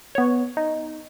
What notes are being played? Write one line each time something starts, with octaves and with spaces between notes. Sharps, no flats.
B3 C#5
D#4